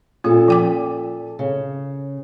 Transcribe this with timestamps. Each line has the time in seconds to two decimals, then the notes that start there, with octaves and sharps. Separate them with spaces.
0.24 A#2 C#4 F4 A4
0.48 F3 G5 D6
1.39 C#3